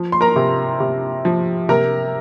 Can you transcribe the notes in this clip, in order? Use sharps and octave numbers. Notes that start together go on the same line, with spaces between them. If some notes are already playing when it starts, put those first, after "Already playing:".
Already playing: F3
C6
A#4 A#5
C3
C3
F3
C3 A#4 A#5